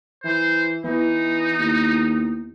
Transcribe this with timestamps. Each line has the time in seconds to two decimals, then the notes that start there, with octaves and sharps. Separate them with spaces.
0.24 E3 C5
0.84 E3 B3 D#4 E4
1.59 D#2